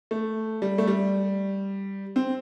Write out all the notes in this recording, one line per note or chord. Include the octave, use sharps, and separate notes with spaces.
A3
G3
A3
G3
C4